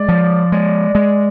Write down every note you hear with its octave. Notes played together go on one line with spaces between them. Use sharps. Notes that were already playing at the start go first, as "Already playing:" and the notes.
Already playing: G#3 D5
F3
G#3
G#3